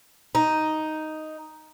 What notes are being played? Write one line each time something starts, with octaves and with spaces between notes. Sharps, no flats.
D#4